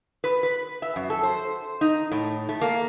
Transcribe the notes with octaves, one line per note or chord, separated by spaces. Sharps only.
B4
B4
E5
F#2
A4
C5
D#4
A2
A3
A#3